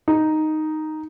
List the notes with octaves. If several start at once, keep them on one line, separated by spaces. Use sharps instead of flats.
D#4